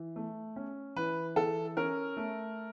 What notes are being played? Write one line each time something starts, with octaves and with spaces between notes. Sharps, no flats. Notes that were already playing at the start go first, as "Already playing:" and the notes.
Already playing: E3
A3
C#4
E3 B4
E3 A4
C#4 A#4
A3